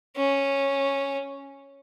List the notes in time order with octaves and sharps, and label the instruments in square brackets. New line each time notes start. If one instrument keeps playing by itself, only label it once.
[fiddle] C#4